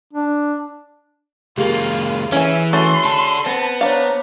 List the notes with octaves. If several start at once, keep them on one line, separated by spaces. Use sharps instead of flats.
D4
C#2 A#3 F4 G4 G#4
E3 C#4 E5 G#5
A3 C#4 F#4 C6
D4 A4
B3 C4 A5
D4 C5 C#5 F5 A#5